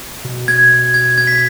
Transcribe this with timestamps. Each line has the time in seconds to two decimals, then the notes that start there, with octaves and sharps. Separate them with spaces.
0.25 B2
0.48 G#6
0.94 G#6
1.18 G#6
1.27 B6